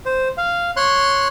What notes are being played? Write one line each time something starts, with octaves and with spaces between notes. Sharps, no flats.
C5
F5
C#5 C6 F#6